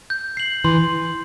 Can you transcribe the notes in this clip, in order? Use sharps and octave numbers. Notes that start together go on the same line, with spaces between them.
G6
C7 F#7
E3 C6